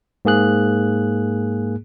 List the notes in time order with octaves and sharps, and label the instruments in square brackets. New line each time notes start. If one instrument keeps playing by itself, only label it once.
[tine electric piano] G#2 A#3 G#4 F#6